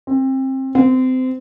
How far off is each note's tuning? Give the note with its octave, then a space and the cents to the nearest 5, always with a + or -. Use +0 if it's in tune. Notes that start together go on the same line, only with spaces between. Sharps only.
C4 +25
C4 -25